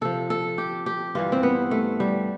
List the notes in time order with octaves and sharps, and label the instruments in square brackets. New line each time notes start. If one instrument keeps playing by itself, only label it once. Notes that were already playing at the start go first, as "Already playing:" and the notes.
[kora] C3 F3 A4
A4
G4
G4
G2 E3 G3 F4
C4
B3
A3
G3